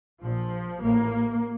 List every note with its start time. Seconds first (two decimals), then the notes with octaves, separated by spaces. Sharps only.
0.22 A#1 A#2 F3
0.82 A1 A2 A#3